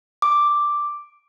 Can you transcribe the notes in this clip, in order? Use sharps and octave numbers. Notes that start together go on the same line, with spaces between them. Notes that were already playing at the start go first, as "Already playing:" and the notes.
D6